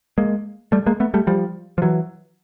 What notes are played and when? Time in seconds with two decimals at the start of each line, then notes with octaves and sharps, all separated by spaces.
0.18 G#3 A#3
0.72 G3 A3
0.86 G#3 A#3
1.00 A3 B3
1.14 G3 A3
1.27 F3 G3
1.78 F3
1.82 E3 F#3